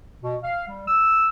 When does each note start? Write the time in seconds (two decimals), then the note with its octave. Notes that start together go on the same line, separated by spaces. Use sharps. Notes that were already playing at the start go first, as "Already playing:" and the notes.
0.22 B2
0.43 F5
0.68 G3
0.88 E6